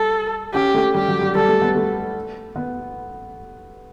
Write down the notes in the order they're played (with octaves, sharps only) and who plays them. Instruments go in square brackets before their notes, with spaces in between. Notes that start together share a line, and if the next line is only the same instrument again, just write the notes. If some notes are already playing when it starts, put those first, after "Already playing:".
Already playing: [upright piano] G3 [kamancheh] A4
[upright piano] C#4 [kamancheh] G4
[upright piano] A3
[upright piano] G3 [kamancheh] G4
[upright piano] F#3
G3
[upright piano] G3 [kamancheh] A4
[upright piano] A3
B3
A3
B3